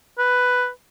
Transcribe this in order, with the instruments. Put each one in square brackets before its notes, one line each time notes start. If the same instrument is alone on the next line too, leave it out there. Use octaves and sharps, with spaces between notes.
[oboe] B4